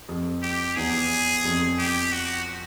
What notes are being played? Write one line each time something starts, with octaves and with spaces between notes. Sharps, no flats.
F2
G4
E2 G#4
F2
G4
F#4